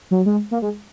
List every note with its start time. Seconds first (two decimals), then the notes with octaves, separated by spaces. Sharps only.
0.11 F#3
0.26 G#3
0.51 A#3
0.62 G#3